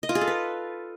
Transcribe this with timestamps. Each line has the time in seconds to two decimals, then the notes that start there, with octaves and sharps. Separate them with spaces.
0.03 D#5
0.09 F4
0.15 G#4
0.21 A4
0.27 B4